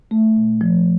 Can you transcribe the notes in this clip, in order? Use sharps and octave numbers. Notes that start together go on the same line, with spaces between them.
A3
A#2
F3